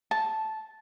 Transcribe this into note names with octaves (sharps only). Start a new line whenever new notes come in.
A5